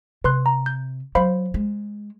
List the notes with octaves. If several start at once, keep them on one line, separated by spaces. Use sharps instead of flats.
C3 B4 C6 F#6
A#5
G6
F#3 C5 F5 B5
G#3